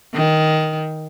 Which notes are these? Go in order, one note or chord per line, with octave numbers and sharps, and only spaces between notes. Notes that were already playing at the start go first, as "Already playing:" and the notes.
D#3